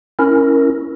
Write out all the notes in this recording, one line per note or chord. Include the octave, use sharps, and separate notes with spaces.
C#4 E4 A#4